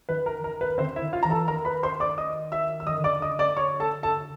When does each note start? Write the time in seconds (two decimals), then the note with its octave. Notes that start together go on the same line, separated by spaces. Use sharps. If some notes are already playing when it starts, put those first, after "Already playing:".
0.09 D#3 B4
0.26 A#4
0.43 D#3 A#4
0.61 B4
0.78 D3 C4 C5
0.96 E4 E5
1.01 D#3
1.13 F4 F5
1.23 E3 A#5
1.30 A4 A5
1.48 D#3 A#4 A#5
1.65 B4 B5
1.83 C5 C6
2.00 D5 D6
2.18 D#5 D#6
2.52 E5 E6
2.80 E6
2.87 D#3 D#5 D#6
2.99 D3
3.04 D5 D6
3.20 D3 D#5 D#6
3.39 D5 D6
3.57 C#5 C#6
3.80 A4 A5
4.03 A4 A5